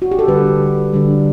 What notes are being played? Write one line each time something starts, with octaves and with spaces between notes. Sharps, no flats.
F#4
G4
A4
D3 G3 B4
D3 G3